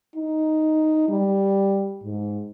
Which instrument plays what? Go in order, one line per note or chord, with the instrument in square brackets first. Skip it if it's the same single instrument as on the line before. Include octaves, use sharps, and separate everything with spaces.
[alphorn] D#4
G3
G#2